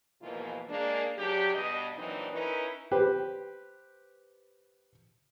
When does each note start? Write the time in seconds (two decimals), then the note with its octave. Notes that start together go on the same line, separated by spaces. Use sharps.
0.22 G#2 B2 E3 F3 A#3 F4
0.69 G#3 A#3 D4
1.18 C#3 F#3 D4 G4
1.54 G2 B2 D#5
1.97 A#2 E3 F#3 C4 D4 D#4
2.32 C#4 D#4 E4 A#4 B4
2.91 G4 B4 C5